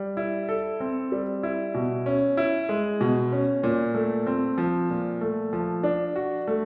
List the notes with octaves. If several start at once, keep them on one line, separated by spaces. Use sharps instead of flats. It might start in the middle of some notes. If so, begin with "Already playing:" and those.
Already playing: G3
E4
A4
C4
G3
E4
B2
C#4
E4
G#3
B2
C#4
A#2
A3
C4
F3
A#2
A3
F3
D4
F#4
A3